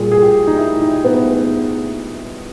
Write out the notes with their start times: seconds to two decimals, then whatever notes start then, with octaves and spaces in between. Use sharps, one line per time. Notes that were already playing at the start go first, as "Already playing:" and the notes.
Already playing: A#2 G3 G#4
0.12 G#4
0.22 G4
0.47 D#4
0.58 E4
0.81 D#4
1.05 B3